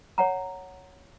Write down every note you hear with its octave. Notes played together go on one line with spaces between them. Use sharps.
C#5 F#5 A#5